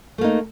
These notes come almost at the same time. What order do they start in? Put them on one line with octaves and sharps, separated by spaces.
A3 A#3 D#4